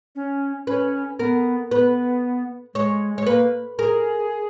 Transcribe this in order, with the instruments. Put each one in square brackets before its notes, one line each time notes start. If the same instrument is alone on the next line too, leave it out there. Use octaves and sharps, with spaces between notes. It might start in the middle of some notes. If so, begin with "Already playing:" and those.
[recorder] C#4
[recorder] C#4 [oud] B4
[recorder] B3 [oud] A#4
[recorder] B3 [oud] B4
[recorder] G#3 [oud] C#5
[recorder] G#3 [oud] C#5
[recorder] A#3 [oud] B4
[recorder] G#4 [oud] A#4